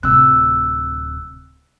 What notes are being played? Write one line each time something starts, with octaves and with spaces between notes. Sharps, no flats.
D1 C3 E6 F#6